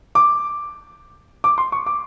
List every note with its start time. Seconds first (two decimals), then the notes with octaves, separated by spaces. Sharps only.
0.15 D6
1.44 D6
1.58 C6
1.72 C#6
1.86 D6